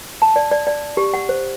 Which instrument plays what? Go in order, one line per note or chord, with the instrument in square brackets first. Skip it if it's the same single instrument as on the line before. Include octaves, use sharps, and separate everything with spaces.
[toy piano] A5
D5
D5
D5
G4
F#5
C5